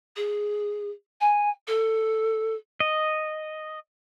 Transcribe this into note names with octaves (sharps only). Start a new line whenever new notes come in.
G#4
G#5
A4
D#5